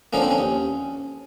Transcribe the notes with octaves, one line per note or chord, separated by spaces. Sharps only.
D3 F3 A#3 C#4
C4
C#4
D#2